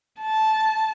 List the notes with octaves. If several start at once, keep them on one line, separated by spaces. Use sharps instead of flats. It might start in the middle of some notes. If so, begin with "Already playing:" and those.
A5